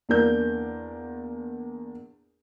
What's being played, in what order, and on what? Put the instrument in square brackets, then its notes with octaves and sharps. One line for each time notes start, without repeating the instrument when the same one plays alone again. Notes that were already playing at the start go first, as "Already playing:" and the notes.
[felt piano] E2 A#3 D4 A#4 G6